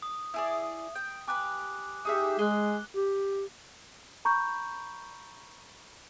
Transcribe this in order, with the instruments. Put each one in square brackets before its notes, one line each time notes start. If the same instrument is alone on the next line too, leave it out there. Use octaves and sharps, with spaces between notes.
[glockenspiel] D#6
[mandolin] E4 G#4 D5
G5
[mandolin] G4 B4 [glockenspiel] G#5 D6 F#6
[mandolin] D#4 G#4 E5 [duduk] G4
[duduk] G#3 [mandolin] G#4 [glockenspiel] F#6 G7
[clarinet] G4
[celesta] A#5 B5 C#6 G6